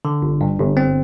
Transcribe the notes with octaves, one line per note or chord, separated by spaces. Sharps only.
D3
G1
G2
G1
C4